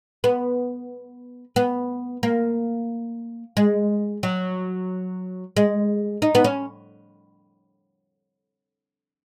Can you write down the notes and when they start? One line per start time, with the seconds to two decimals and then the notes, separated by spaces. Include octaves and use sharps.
0.24 B3
1.56 B3
2.23 A#3
3.57 G#3
4.23 F#3
5.57 G#3
6.22 D#4
6.35 B3
6.44 C#4